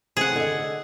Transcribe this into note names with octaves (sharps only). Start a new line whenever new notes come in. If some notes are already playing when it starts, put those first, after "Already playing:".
F#2 A2 C3 G#4 F#5
D3 D#5